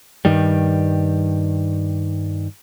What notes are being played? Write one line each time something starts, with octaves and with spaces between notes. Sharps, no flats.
G2 D#3 G3